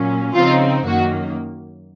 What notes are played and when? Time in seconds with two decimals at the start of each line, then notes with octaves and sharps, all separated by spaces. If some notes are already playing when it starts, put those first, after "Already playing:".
Already playing: A#2 F#3 C#4
0.34 C#3 F3 C4 D#4 F4
0.84 F#2 D#3 A#3 F#4